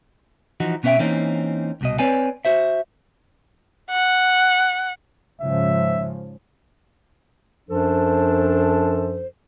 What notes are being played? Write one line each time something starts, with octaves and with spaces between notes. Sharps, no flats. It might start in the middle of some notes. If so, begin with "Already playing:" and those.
E3 F3 D#4 F#4
B2 B3 C#4 C5 E5 G5
E3 A#3 C4 C#4 D#4
C2 B2 D#5
C4 B4 C#5 D5 G#5
F#4 C5 E5
F#5
G#2 C#3 F3 E5
F#2 F3 D4 A4 C5